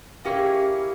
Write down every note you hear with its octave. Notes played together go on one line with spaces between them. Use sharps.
A#3 C#4 E4 G4 G#4